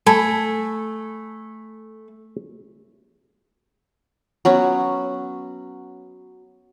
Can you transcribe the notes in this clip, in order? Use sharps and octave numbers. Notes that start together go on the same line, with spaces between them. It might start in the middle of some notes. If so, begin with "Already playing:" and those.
A3 A4 G#5 B5 G#6
F#3 B3 C#4